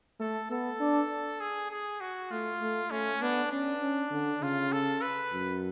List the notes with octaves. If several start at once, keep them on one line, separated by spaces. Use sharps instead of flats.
A3 A4
B3 A4
D4
G#4
G#4
F#4
A3 F4
A3
A3 C#4
B3 D4
C#4 D4
C#4
D3
C#3 F4
A4
B4
F#2